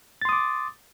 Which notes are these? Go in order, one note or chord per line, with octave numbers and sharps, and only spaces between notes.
C6 D6 D#6 A6